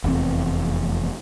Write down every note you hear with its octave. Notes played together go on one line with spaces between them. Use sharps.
F1 E2 A#2 C4